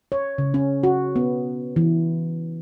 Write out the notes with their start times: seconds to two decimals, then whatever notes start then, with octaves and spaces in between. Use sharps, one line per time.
0.12 C#5
0.38 C#3
0.54 C#4
0.83 F#4
1.16 B3
1.76 E3